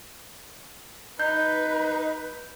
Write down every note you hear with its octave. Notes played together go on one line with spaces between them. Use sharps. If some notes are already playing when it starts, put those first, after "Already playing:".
D#4 B4 G6